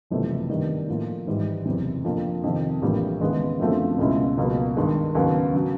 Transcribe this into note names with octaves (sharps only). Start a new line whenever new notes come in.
F#1 F2 C3 E3 A3
G2 D#3 G3 B3 D4
A2 F3 A#3
G#1 G#2 E3 G3
F#1 E2 C3
F2 D3 F3 A#3
F2 C3 D#3
A#1 A2 E3 G3 A#3
D#2 C#3 E3 G#3 B3
F#2 D3 F3 A3 C4
C#2 B2 G#3 C#4 E4
C#2 B2 F#3 A#3
G2 D#3 G#3
D#2 C#3 F#3 B3
C#3 F#3